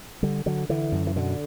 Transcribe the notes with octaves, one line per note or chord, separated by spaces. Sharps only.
D3 G3
D3 F#3
D3 E3
F#2
E3
B2 D3